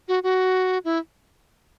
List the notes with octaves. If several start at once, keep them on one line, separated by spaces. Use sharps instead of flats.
F#4
F#4
E4